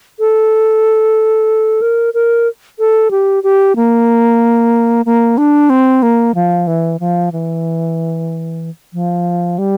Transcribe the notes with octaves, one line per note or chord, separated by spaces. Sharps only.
A4
A#4
A#4
A4
G4
G4
A#3
A#3
D4
C4
A#3
F3
E3
F3
E3
F3
G3